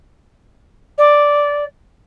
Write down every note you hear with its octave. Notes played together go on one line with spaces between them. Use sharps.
D5